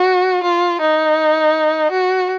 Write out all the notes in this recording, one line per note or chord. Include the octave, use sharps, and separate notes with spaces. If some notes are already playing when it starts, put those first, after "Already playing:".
Already playing: F#4
F4
D#4
F#4